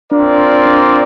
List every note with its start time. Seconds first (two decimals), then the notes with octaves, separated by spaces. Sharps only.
0.11 C4 D4 F4 A#4 D5
0.66 D4